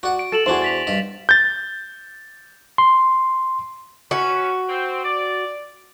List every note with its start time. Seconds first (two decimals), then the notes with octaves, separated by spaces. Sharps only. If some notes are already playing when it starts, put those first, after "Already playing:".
0.03 F#4 D5 F#5
0.19 D7
0.32 A4 A6 E7 F#7
0.46 E2 D4 F#4 G#4 C5
0.62 A6 B6 F7
0.87 G2 D#5
1.29 G6 A6
2.78 C6
4.11 C#4 F#4 B4
4.69 C4
5.04 D5